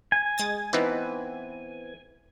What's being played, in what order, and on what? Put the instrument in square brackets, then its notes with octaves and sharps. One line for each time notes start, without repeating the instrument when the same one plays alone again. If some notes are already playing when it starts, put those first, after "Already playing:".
[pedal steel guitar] G#5
[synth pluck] G#3 D#6 A6
[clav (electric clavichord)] E3 B3 C4 [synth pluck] D#4 B4